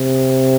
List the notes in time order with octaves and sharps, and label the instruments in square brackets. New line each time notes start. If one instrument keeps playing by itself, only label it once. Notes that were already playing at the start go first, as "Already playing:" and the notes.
Already playing: [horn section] C3